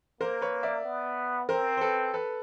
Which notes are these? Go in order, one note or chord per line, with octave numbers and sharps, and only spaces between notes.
A#3 A#4 C5
B4 C#5
D5 E5
B3
C4 A#4 C5
C5
A4 B4
A4 B4